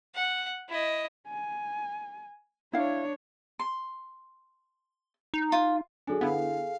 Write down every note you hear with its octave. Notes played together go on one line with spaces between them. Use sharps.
F#5
E4 D#5
G#5
D4 E4 C#5 F5
C6
D#4
F4
F#3 D4 G#4 A4 G#5
D3 B3 E4 F5